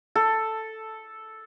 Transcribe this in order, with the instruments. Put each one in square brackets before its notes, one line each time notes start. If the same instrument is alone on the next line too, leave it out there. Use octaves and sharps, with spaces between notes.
[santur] A4